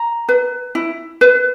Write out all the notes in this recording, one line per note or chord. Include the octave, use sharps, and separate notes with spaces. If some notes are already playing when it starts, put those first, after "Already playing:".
Already playing: A#5
B4
E4
B4